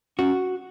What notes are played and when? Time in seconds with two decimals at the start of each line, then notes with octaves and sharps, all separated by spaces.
0.18 C#4 F#4